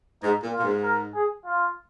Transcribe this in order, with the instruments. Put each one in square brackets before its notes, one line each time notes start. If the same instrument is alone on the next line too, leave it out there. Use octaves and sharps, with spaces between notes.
[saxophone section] G#2 [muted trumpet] D#4
[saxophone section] A#2
[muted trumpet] F4
[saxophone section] A#2
G#2
[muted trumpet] A#4
G#4
F4